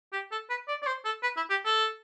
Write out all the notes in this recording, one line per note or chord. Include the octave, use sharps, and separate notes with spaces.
G4
A4
B4
D5
D5
C5
A4
B4
E4
G4
A4